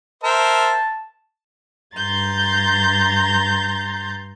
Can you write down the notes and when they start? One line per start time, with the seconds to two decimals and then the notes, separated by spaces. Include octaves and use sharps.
0.24 A#4 C5 E5 A5
1.96 G2 A#5 C6 G6 A6